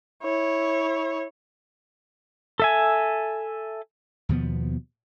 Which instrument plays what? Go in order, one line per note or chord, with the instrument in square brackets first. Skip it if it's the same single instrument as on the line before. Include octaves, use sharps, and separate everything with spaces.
[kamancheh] E4 C#5
[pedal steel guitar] A4 E5 G#5
[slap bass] D#2 B2 F3 B3